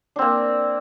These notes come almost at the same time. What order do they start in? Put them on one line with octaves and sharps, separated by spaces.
D4 C4 A#3